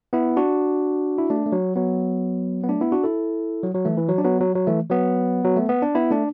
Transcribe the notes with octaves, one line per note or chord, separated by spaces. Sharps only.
B3 E4
D4 F#4
E4
A3 D4
A3
F#3
F#3 B3
B3
A3 D4
B3 E4
D4 F#4
E4 A4
F#3
F#3
E3 A3
E3
F#3
D4
F#3 B3
F#3
F#3
E3 A3
F#3 B3
F#3
A3
B3
D4
B3 E4
A3 D4